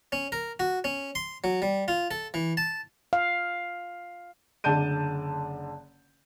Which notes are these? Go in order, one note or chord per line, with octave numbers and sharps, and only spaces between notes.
C#4
A#4
F#4
C#4
C6
F#3
G3
F4
A4
E3
A5
F5
F#1 D3 D5 A5 G6 D#7